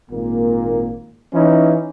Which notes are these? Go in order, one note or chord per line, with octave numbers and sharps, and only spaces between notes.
G#1 A#2 A#3
E3 C#4 D#4